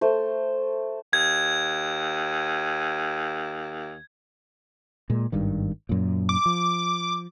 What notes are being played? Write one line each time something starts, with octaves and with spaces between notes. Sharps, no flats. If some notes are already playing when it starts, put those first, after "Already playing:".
A3 C5
D#2 G#6
A#2 G#3
G#1 G2 D#3
F#2 A#2
D6
F3